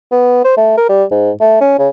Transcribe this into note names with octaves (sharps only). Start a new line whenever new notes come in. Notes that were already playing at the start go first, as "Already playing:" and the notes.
B3
C5
A3
A#4
G3
G#2
A3
C#4
C#3